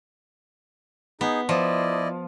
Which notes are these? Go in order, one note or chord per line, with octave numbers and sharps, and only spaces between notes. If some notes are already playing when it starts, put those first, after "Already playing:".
B3 D#4 G#4
F3 E4 D5 D#5